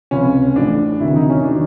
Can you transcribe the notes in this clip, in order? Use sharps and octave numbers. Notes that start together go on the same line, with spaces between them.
C#2 C3 F3 C#4
A1 A2 F3 D4
E1 D2 C3 D#3 F#3 E4
D#4
C#4
D#3 F#3 D4